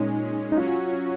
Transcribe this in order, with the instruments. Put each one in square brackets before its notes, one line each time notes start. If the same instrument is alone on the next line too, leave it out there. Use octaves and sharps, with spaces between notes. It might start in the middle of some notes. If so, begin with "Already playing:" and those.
Already playing: [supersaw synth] A#2 G#3 C#4 [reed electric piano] D#4
[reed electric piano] D#4
[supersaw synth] F#3 C#4 F#4 C#5 [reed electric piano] F4